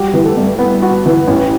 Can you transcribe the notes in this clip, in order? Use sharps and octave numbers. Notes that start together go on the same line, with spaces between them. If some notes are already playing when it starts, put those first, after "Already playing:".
Already playing: G3 F#4 G4
E3
A3 A4
G2
B3
F#4
E3
A1 C#4 C#5